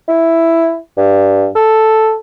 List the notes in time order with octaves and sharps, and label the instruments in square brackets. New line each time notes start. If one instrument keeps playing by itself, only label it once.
[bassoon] E4
G2
A4